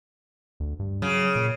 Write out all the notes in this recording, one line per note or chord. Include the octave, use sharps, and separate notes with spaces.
D2
G2
C#3 F#3
A#2